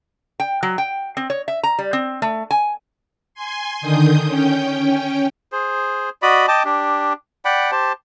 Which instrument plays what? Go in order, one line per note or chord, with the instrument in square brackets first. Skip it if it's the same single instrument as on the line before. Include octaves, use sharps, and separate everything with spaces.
[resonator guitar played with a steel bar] G5
F#3
G5
C4
C#5
E5
A#5
G3
C4
A3
G#5
[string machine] G#5 C6
D3 D#3 D#6 G6
C#4 G5
[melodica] G#4 C5
F#4 D5 D#5 B5
D#5 G5 A5 D6
D4 G4
D5 F#5 G5 B5
G4 C5 A5